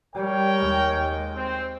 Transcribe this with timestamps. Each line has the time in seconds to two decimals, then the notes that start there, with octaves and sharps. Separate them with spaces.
0.14 G3 A#4 C#5 G5
0.60 D#2 G#3
1.34 C4